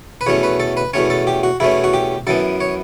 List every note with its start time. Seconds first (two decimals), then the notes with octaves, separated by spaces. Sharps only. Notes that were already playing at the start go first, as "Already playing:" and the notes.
0.21 B4
0.26 E2 B2 A3 C#4 C#5
0.43 B4
0.60 A4
0.77 B4
0.94 E2 B2 A3 C#4 C#5
1.10 A4
1.27 G4
1.43 F#4
1.60 E2 B2 A3 C#4 E4
1.84 F#4
1.94 G4
2.27 F#2 E3 B3 A4
2.61 C#5